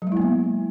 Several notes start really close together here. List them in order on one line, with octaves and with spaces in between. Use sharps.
F#3 G#3 E4 A#3 B3